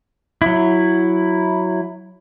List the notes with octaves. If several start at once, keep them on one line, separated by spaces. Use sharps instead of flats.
F#3 E4